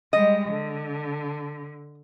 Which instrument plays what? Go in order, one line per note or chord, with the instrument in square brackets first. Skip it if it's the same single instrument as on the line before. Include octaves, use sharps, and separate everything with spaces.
[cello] G3 G#3 [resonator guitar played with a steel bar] D#5
[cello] D3